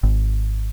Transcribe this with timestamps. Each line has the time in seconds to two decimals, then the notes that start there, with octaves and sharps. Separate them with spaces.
0.03 G#1